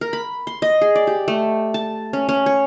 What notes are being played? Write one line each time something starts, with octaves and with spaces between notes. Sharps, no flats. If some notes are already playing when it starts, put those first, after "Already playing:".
A#4
B5
C6
D#5
G#4
D5
G4
A3
A5
C#4
C#4
C#5